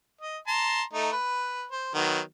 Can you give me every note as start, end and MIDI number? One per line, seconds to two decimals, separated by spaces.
0.21 0.38 75
0.48 0.82 81
0.48 0.82 82
0.48 0.82 84
0.93 1.11 57
0.93 1.11 63
1.12 1.65 71
1.72 1.91 72
1.95 2.20 51
1.95 2.20 54
1.95 2.20 59